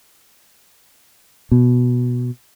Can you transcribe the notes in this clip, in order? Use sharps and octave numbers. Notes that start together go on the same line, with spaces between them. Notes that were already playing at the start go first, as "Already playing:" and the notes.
B2